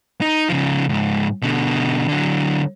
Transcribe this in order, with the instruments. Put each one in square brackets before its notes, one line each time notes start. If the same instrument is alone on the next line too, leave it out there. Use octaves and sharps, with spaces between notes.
[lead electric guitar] D#4
C#3 F3
C#2 G#2
B2 D3
D3 F#3